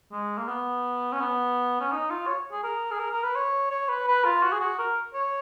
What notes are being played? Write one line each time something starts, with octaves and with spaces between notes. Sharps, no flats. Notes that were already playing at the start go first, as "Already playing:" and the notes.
G#3
A#3
B3
C#4
B3
C#4
D#4
F4
C#5
G#4
A#4
G#4
A#4
A#4
B4
C#5
C#5
B4
B4
F4
F#4
G#4
F#4
A#4
C#5